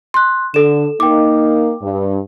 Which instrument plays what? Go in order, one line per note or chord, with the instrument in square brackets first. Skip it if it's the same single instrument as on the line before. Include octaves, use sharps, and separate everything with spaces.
[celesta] C6 F#6
[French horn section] D3 [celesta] A4 E7
[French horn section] A#3 D#4 [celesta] G5 D6
[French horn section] G2